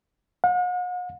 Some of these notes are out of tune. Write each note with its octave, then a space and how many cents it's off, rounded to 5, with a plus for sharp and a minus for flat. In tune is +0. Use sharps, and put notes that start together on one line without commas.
F#5 -45